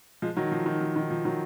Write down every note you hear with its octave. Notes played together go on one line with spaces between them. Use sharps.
F3 G#3
D#3 F#3
F3
D#3
F3
D#3
F3
D#3 F#3